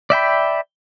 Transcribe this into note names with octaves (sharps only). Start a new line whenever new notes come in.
D5 E5 G5 B5